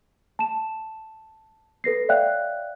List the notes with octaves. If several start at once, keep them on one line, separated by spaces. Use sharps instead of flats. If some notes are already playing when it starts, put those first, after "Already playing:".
A5 E7
A4 B4 A#6 C7
C#5 D5 E5 F5 G5 F#6